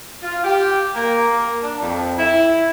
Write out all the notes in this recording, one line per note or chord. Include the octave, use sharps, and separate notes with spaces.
F4
G4
A#3
D4
F2
E4